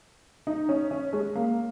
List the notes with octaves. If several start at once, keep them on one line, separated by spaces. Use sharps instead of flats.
D#4
C#4
C#4
G#3
A#3